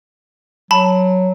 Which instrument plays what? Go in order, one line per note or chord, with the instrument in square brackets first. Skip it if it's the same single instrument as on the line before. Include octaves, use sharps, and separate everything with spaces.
[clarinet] F#3 [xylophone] A5 B5